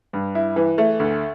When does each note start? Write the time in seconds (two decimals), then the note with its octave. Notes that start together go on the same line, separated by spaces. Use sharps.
0.13 G2
0.35 E4
0.56 E3
0.78 A3
1.00 D2